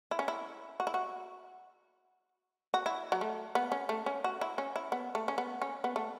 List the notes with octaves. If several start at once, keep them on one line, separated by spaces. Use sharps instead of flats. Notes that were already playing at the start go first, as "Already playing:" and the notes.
E4
C#4
E4
F#4
E4
F#4
F#4
E4
F#3
A3
B3
C#4
A3
C#4
F#4
E4
C#4
E4
B3
A3
C#4
B3
C#4
B3
A3